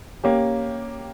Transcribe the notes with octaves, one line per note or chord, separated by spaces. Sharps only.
A#3 C#4 G4